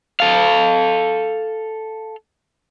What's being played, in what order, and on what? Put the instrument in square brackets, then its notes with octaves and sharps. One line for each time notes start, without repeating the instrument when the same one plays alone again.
[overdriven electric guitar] A4 F5